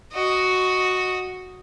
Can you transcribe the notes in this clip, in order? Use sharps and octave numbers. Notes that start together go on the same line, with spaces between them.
F#4 D#5